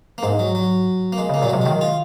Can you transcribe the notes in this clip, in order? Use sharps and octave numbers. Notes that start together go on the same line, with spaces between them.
A#3
G#2 G#3
F#3
F#3
A#3
G#3
C#3
A#3
A#2 F#3
C3 G#3
F#3
D#3 G#3
F4